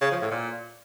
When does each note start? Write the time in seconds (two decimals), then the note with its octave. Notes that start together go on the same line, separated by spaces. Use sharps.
0.02 C#3
0.11 F3
0.21 A2
0.31 A#2